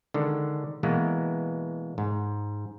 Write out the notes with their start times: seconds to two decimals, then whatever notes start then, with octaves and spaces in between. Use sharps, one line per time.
0.14 D3 D#3 G#3
0.83 B2 E3 G#3 A#3 B3
1.98 G#2